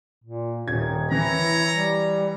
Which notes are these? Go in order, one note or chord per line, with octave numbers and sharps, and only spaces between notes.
A#2
D#1 D#3 G#6
E3 E4 C#5 A#5
G3